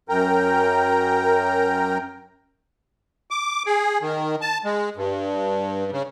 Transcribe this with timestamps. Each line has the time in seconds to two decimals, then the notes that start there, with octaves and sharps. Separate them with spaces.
0.09 F#2 A#4 G5 A#5
3.31 D6
3.66 G#4
4.02 D#3
4.41 A5
4.65 G#3
4.97 G2
5.92 C#3